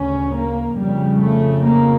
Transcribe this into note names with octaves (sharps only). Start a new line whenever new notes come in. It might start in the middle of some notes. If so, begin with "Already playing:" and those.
Already playing: D2 C#3 C#4
A#3
F2 C#3 G3
A3
A#3